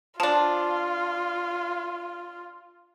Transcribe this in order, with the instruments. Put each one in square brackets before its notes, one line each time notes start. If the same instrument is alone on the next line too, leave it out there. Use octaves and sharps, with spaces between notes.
[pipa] F3 D4 [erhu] F4 [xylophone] A5